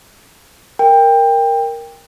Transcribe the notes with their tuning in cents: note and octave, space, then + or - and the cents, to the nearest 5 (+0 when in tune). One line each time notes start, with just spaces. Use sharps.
A#4 +0 G5 +20